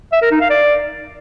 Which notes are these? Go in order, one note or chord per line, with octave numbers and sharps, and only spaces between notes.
E5
A#4
D#4
F5
D5